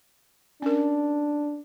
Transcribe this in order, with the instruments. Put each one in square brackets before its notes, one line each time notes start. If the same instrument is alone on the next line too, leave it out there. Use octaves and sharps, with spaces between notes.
[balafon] C#4 A#4 [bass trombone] D4